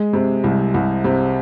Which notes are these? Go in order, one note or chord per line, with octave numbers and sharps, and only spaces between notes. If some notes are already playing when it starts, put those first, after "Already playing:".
Already playing: G#3
C3
C2
C2
C3